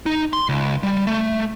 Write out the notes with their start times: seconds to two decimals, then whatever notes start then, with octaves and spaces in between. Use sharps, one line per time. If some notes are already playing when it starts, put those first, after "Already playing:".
0.06 D#4
0.33 C6
0.49 C#2
0.83 G3
1.07 A3